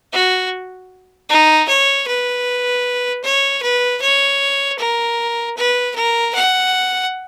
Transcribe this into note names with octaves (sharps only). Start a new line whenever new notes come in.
F#4
D#4
C#5
B4
C#5
B4
C#5
A#4
B4
A#4
F#5